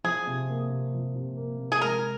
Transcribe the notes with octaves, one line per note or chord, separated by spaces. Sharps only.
F3 G#4
C3
A#3
C3
F3
C3
A#3
C3
G#4
G#3 A#4